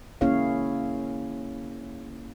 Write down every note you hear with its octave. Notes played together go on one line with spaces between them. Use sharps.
A#3 C#4 E4 G#4 C#5 F5